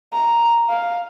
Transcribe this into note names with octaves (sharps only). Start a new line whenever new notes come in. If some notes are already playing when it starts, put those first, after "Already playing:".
A#5
F5